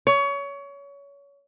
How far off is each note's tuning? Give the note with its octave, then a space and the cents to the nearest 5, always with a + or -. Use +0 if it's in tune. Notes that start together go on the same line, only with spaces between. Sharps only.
C#5 +25